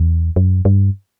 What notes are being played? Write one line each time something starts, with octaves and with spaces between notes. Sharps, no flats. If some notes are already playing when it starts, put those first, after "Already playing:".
Already playing: E2
F#2
G2